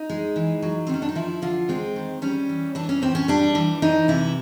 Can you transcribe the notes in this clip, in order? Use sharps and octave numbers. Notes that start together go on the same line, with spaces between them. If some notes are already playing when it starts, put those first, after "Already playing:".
Already playing: D#4
G#3
E3
F#3
C4
D#3 C#4
D4
D#4
F3 E4
D3 F4
G#3 C4
D#3
G3 C#4
E3
E3 D4
C#4
A2 C4
C#4
G3 D4
E3
E3 D#4
C3 E4